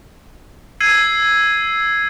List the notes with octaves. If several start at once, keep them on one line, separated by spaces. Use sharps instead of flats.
E6 G#6 C7 D#7